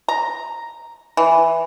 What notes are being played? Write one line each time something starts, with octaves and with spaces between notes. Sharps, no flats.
A#5
E3